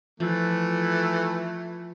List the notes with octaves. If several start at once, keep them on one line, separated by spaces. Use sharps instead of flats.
E3 F3 A3